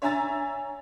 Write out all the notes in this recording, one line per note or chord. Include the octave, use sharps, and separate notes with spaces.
C#5 E5 G#5 A#5 E6 A6